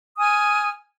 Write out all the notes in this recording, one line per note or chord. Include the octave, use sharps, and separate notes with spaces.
G#5 D#6 F6